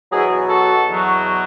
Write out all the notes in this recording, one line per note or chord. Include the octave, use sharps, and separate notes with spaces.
E2 B2 F#3 E4 G#4
F#4 A4
E2 B2 F#3